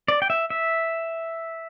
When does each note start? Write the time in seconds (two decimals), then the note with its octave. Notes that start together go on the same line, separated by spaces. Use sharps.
0.08 D5
0.22 G5
0.30 E5
0.50 E5